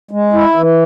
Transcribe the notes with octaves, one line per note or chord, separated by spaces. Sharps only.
G#3
E4
E3